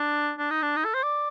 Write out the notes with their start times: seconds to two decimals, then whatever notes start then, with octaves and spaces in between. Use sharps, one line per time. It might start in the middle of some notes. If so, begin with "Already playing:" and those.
Already playing: D4
0.39 D4
0.51 D#4
0.63 D4
0.76 D#4
0.85 A4
0.94 C5
1.04 D5